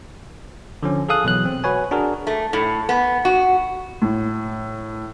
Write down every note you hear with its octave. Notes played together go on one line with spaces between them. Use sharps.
D3 F3 C#4
G#4 A4 F5 D#6 F#6
B2 E3 F#3 F#6
C4
F#4 B4 C#5 G#5
D4 F#4 G#4 A#4
A3
A2
B3
F#4
A2